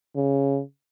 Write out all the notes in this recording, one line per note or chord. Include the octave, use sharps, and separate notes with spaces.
C#3